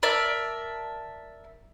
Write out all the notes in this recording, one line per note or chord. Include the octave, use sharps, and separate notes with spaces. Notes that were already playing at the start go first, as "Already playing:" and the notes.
A#4 D5 E5 A5